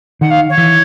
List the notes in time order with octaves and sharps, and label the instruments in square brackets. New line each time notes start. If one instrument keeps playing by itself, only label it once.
[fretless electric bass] D#3 [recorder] F#5
[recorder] F5
C#5
[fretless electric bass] E3